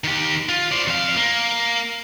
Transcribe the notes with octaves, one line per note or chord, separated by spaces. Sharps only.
D#3 G4
F4
C5 D5
F2 F5
A#3